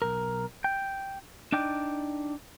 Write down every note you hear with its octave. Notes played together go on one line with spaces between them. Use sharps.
B1 A#4
G5
D4 D#4 D5 G5